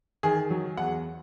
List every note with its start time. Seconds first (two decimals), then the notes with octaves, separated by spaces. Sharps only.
0.23 D#3 G#4
0.50 F#3
0.77 E2 F#5